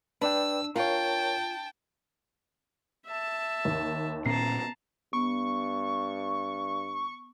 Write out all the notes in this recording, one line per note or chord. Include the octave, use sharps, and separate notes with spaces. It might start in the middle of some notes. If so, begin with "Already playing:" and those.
D4 B4 D5 G5 E6
F4 A#4 C#5 G5 A5
E5 A5
D#2
A#2 B3 C#4 A5 A#5 C7
G2 B3 C#6